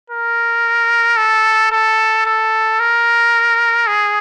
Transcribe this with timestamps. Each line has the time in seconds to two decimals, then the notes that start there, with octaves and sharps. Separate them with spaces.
0.10 A#4
1.17 A4
1.72 A4
2.26 A4
2.80 A#4
3.87 G#4